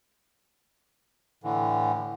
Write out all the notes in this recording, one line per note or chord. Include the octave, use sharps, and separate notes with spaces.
A2 D3 E3